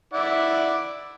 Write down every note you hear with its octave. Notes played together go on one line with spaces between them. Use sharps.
E4 D5 F#5